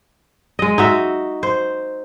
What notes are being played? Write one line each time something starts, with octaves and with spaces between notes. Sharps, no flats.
G#3 D#5
D#4 F#4 E5
C5